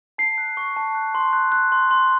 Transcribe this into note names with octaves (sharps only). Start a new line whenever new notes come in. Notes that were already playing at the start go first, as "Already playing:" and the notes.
A5 C7
F#6
C#6
A5
F#6
C6
F#6
F#6
C6
C6